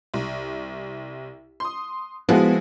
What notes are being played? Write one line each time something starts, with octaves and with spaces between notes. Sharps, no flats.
C2
C6 D#6
F3 G#3 B3 E4 F#4 G#4